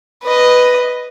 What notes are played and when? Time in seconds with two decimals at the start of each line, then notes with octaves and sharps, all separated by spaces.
0.24 B4 D#5